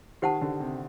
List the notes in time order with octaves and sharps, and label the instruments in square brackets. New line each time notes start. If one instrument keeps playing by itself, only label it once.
[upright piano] D#3 [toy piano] G4 C5 F#5 A5
[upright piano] D3
C3